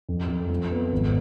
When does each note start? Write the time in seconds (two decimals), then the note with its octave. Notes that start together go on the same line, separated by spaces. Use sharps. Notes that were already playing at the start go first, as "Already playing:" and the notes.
0.08 F2
0.29 F2
0.50 F3
0.71 B3
0.92 G#1